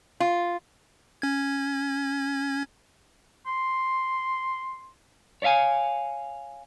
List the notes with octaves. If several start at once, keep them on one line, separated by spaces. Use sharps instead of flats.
F4
C#4 G#6
C6
C#5 D5 E5 F5 G#5